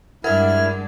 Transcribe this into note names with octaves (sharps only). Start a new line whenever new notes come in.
G2 G#3 D4 E4 A#4 F#5 F6 G#6